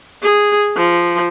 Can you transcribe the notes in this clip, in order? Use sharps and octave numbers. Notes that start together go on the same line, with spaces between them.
G#4
F3